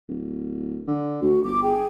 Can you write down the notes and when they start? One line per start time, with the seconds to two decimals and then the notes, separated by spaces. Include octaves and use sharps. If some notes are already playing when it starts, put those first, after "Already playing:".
0.09 D1
0.88 D3
1.22 D2 F#4
1.43 G1 D6
1.63 G#4 G5